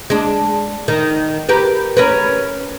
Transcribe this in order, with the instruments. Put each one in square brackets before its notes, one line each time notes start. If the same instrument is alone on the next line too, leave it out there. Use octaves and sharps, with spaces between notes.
[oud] G#3 D4
D#3
G4 A#4 B4
C#4 A#4 B4